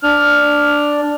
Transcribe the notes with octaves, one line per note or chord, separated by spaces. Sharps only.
D4 F6